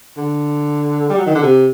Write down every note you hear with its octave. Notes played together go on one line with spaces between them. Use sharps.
D3
G3
F#3
D#3
D3
C3